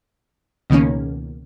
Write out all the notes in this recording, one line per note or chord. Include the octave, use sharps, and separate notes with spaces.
C#2 B2 D#3 A#3 C#4